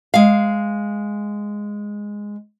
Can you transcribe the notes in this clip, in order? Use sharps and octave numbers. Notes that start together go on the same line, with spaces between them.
G#3 F5